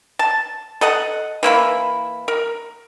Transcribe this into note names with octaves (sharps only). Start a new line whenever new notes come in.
A5
A4 D#5 F#5
E3 A#3 E4 B5
A#4